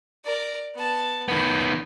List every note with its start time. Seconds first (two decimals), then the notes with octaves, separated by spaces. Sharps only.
0.24 A#4 D5
0.75 B3 A5
1.28 D#3 B3 B5